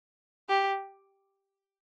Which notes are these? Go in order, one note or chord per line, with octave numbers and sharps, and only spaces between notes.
G4